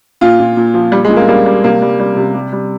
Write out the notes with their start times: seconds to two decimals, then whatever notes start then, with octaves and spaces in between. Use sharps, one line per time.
0.21 A#2 F4
0.40 A#2
0.57 A#2
0.74 F3
0.92 G3
1.04 G#3
1.10 A#2
1.16 A#3
1.28 G3 A#3
1.46 G3
1.64 C3 A#3
1.82 G3
2.00 G3
2.16 C3
2.34 G3
2.53 G3